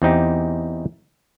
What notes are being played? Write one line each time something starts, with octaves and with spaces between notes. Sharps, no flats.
E2 C4 D#4 G4